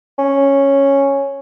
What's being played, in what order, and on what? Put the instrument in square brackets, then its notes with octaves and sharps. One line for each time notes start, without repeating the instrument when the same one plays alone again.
[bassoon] C#4